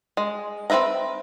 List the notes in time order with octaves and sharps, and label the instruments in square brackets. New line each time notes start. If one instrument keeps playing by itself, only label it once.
[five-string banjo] G#3
C4 A4 B4 E5 A#5